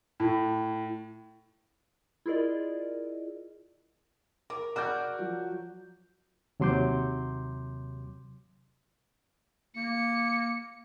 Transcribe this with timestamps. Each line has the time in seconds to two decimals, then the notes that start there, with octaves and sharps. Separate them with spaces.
0.20 A2
2.26 E4 F4 G#4 A#4 D5 D#5
4.50 A#4 D6
4.76 F#4 A#4 D5 D6 F6 G6
5.19 F3 F#3
6.60 D#2 C3 F#3 C6 D6 G6
9.76 A#3 C#7